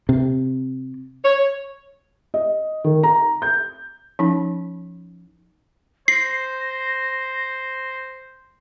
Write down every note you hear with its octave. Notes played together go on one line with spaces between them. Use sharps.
C3
C#5
D#5
D#3
A#5
G6
F3 C#4 D#4
C5 A#6 C7